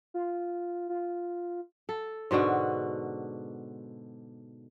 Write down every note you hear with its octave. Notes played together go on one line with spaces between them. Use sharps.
F4
F4
A4
G#2 B2 D3 F#4